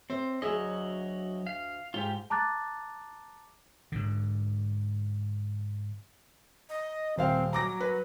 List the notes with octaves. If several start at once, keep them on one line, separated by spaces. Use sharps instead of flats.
C4 C5 E5
D2 F#3 G#4 D#5 E5
F5
G#2 F4 G4
A5 A#5 D6 F#6 A6
G#2 D3
D#5
D#1 C4 C5 F5
F#3 A#5 D6 A#6
B4